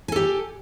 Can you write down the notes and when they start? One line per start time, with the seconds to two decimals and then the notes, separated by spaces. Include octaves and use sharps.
0.08 G#5
0.12 A4
0.16 G4